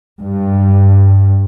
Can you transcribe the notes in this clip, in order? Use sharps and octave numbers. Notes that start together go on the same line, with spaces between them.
G2